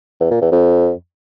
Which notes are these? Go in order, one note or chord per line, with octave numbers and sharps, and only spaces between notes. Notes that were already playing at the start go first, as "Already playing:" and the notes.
E2
A#2
E2
F2